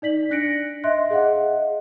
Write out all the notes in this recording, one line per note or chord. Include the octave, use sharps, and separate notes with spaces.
D#4 D5 B6 F#7
D4 F#6 A#6 C#7 D7
D#5 E5 C6 F#6
G#4 D#5 F5 F#5